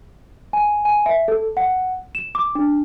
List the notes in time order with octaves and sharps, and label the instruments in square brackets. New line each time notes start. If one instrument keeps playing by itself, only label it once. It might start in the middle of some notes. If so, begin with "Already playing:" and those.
[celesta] G#5
G#5
E5
A4
F#5
E7
D6
D4